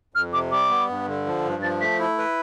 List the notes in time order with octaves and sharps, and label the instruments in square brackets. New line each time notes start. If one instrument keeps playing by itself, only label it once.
[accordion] F2 [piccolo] F6
[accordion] C3 [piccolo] D6
[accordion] G3 [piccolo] D6
[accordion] B3
G2
D3
F3
G2
[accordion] F3 [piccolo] A6
[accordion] A3 [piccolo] B6
[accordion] E4
B4